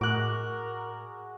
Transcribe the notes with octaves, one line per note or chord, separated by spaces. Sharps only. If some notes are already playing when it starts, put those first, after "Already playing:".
A2 G#3 F#4 A#4 D6 F#6